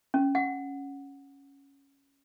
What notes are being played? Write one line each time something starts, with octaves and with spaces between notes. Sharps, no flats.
C#4
F#5